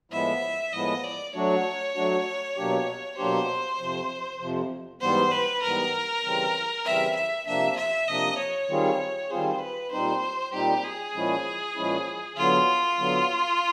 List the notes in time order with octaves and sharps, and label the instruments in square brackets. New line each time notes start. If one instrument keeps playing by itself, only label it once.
[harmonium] A2 F3 G#3 B3 E4 [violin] E5
[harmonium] A2 F3 G#3 B3 E4 [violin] D#5
[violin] D5
[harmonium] F#3 A3 D4 F#4 [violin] C#5
[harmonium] F#3 A3 D4 F#4
B2 F#3 A#3 D4 G4
[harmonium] B2 F#3 A#3 D4 G4 [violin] C5
[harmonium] F2 C3 F3
F2 C3 F3
[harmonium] G#2 E3 G3 B3 [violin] C5
[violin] B4
[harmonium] G#2 E3 G3 B3 [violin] A#4
[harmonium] C#3 E3 G3 C4
[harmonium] C#3 E3 G3 C4 [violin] E5
[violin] E5
[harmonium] C3 F3 A#3 D4 [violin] E5
[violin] E5
[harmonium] C3 F3 A#3 D4 [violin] D#5
[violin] C#5
[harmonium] D#3 G3 C4 F4 G#4
[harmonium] D#3 G3 C4 F4 G#4 [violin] C5
[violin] B4
[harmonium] A#2 G3 C4 D#4 [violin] C5
[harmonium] A#2 G3 C4 D#4 [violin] G4
[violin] G#4
[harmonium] A#2 F3 G#3 C#4 E4
A#2 F3 G#3 C#4 E4
[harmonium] D3 F#3 B3 [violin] F4
[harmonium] D3 F#3 B3